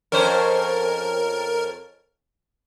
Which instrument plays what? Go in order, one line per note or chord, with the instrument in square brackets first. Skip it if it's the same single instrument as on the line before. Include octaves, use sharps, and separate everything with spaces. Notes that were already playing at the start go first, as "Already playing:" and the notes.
[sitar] F2 C#4 C5 [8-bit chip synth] A#4